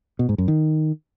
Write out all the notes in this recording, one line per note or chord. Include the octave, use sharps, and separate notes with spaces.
B2
G#2
F#2
D#3